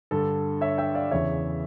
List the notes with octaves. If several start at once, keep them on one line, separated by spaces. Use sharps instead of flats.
G2 D3 A4
C#5 E5
E5 G5
D5 F5
E2 C#3 E3 C#5 E5